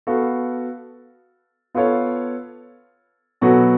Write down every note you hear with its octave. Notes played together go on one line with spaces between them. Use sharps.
B3 F#4 A4 F5
B3 F4 A4 C#5 F5
B2 F#3 B3 F#4 A4